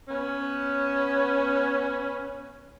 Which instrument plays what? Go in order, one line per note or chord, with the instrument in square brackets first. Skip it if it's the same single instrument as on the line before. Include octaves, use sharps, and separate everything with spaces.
[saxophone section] B3 C#4